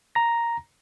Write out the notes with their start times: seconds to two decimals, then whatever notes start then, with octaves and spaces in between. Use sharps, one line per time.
0.15 A#5 A#6